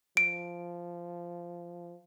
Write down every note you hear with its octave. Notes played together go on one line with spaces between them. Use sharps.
F3 D7